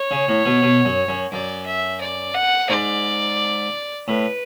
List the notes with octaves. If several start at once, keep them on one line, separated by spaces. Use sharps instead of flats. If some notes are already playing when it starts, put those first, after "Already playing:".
Already playing: C#5
C#3
A2
B2
B2
F#2
F#2
F#2 D5
E5
D5
F#5
G#2 D5
A2 B4